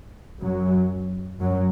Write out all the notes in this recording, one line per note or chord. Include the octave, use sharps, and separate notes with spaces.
F#2 F#3
F#2 F#3